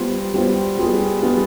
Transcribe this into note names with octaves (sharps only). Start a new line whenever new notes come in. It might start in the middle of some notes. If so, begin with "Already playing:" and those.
Already playing: G3 B3 F4 C5
G3 B3 F4 C5
G3 B3 F4 G#4
G3 B3 F4 G#4